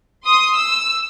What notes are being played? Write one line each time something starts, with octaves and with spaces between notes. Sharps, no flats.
C6 D#6
E6